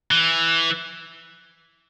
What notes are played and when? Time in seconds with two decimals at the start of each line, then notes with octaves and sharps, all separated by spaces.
0.11 E3